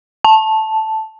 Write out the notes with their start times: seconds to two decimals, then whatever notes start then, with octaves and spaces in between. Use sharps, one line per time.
0.25 A5